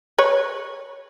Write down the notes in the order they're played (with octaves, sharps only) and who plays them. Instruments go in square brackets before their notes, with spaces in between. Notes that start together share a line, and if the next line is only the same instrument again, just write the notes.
[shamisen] B4 C#5